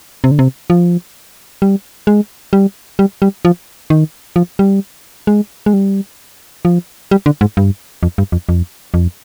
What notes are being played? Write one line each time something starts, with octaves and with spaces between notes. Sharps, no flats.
C3
D3
C3
F3
G3
G#3
G3
G3
G3
F3
D#3
F3
G3
G#3
G#3
G3
F3
G3
D3
G#2
G2
F2
G2
F2
F2
F2